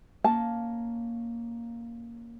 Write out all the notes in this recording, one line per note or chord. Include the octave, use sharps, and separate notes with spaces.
A#3 C#4 A5